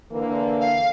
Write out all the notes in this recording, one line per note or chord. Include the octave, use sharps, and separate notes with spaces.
D3 E3 A#3
F5